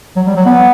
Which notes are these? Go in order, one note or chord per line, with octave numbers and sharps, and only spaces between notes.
F#3
G3
F#3
B3